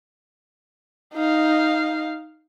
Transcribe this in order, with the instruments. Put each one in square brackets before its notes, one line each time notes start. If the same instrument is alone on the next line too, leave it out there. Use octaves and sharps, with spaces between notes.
[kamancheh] D#4 F5